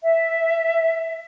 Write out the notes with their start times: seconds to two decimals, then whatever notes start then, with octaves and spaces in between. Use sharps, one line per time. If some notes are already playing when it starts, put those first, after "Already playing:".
0.02 E5